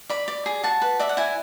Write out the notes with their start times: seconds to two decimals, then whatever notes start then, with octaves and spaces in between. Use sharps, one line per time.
0.10 D5 B5
0.28 D5
0.46 G#4
0.63 F#4 A5
0.82 B4
0.99 D5 E5
1.09 F#5
1.17 E4 G#5